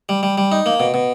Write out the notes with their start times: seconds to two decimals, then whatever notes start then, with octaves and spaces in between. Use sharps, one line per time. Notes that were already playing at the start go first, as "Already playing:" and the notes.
0.09 G3
0.23 G3
0.38 G3
0.52 D#4
0.66 A#3
0.80 B2
0.94 B2